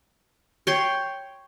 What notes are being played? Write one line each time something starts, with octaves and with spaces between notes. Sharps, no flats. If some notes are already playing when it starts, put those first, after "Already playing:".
C#5 G5 C6